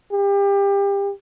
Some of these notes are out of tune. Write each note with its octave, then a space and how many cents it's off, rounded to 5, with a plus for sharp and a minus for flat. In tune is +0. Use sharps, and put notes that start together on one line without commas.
G4 +30